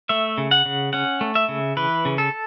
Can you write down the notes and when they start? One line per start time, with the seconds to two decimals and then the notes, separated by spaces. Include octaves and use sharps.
0.09 A3 E5
0.38 C#3
0.51 F#5
0.66 C#3
0.93 C#4 F#5
1.21 A3
1.35 E5
1.49 C#3
1.77 E3 B4
2.05 C#3
2.18 A4